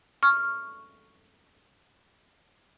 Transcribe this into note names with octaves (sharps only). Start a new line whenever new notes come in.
C#6 F6